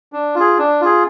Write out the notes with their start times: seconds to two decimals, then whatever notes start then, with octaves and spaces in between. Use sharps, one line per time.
0.13 D4
0.35 F4
0.40 G#4
0.59 D4
0.81 F4 G#4